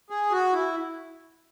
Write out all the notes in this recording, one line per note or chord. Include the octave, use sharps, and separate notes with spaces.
G#4
F#4
E4